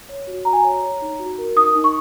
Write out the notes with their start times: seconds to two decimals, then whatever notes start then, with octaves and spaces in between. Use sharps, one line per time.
0.09 C#5
0.27 F#4
0.45 F#4 A#5
0.53 G#5
0.61 C#5 A#5
0.83 C#5
1.02 D#4
1.19 F#4
1.38 A#4
1.56 D#4 D#6
1.75 D#4
1.84 C#6